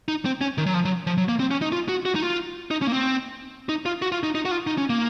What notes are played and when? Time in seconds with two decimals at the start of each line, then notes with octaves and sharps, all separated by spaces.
0.08 D#4
0.25 C4
0.41 C#4
0.58 D#3
0.66 F#3
0.74 F3
0.85 F#3
1.07 F3
1.18 F#3
1.29 A#3
1.40 C4
1.51 C#4
1.62 D#4
1.72 F4
1.89 F#4
2.05 F#4
2.15 D#4
2.22 F4
2.71 D#4
2.82 C#4
2.87 A#3
2.92 C4
3.69 D#4
3.86 F4
4.02 F#4
4.12 F4
4.23 D#4
4.35 D#4
4.45 F#4
4.51 F4
4.67 D#4
4.78 C#4
4.90 A#3